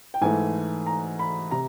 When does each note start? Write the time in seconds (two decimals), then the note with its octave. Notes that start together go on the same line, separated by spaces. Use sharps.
0.14 G5
0.21 G#2 E3 A3 G#5
0.86 A#5
1.19 B5
1.51 C3 A#5